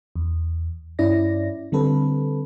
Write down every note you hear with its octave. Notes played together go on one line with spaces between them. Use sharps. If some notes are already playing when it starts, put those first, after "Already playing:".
E2
G2 C#4 E4 D5 A#6
D3 G3 C4 A4 B4